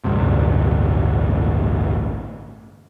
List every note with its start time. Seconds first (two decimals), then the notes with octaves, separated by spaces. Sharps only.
0.04 A1 D2 G2 C3